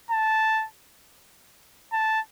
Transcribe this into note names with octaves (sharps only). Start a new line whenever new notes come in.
A5
A5